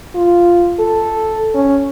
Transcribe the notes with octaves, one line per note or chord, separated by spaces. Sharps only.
F4
A4
C#4